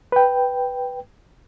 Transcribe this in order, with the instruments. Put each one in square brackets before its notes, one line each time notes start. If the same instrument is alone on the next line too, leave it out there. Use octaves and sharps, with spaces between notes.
[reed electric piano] B4 G5